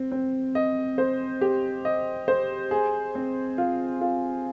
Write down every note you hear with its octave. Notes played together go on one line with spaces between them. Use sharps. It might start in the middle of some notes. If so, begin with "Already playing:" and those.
Already playing: C4
C4
D#5
C5
G4
D#5
C5
G#4
C4
F4
F4